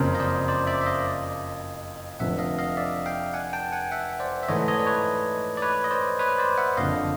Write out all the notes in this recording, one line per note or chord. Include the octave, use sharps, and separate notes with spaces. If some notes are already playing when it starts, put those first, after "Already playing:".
Already playing: F#1 F2 C#3 A#4 C5
D#5
C5 D5
C5 D5
D5 E5
E5
D#5 F5
F1 F2 D3 F3 E5 F#5
D#5 F5
D#5 F5
D5 E5
F5 G5
F#5 G#5
G5 A5
F#5 G#5
E5 F#5
C5 D5
E5
G#2 E3 A3 C#5 D#5
C#5 D#5
D5
B4 C#5
D5
B4 C#5
D#5
C5 D5
B4 C#5
C5 D5
E5 F#5
F#1 F2 D3 D#5 F5